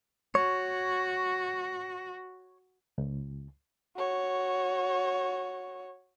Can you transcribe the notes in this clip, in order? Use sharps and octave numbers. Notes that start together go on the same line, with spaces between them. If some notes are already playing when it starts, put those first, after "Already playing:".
F#4 C#5
C#2
F#4 C#5